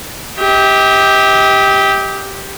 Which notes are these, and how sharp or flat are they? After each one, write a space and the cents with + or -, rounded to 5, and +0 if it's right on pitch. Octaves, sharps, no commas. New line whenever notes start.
G4 +0 D#5 +45